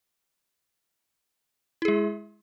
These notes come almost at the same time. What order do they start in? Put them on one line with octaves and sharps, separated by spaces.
E4 G#4 G#3